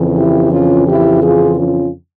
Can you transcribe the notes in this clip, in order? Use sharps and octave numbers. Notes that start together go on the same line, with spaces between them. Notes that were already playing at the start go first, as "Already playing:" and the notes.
Already playing: F2 C#3 E3
E4 G4
C#4 F4
E4 G4
F4 G#4
C#4 F4